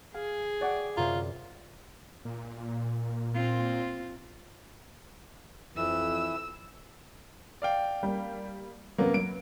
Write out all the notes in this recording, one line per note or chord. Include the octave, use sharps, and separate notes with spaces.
G#4 F5
F#4 D5 F#5 G5
F#2 C3 F4 C5 C#5 A#5
A#2
C4 F4
F2 E3 E6
D5 F5 G5
G3 A#3
F#2 C3 F#3 A#3 B3
F#3 B4 D7